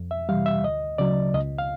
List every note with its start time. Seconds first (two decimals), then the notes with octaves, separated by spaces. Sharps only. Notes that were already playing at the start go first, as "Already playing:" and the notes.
Already playing: F2
0.11 E5
0.29 C3 E3 G3 F5
0.46 E5
0.64 D2 D#5
0.98 C#3 F#3 D5
1.34 C#2 D#5
1.58 F5